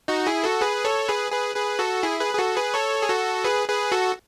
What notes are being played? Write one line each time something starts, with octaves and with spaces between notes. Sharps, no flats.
D#4 F#4
E4 G#4
F#4 A4
G#4 B4
A4 C#5
G#4 B4
G#4 B4
G#4 B4
F#4 A4
E4 G#4
G#4 B4
G#4
F#4 A4
G#4 B4
A4 C#5
G#4
F#4 A4
G#4 B4
G#4 B4
F#4 A4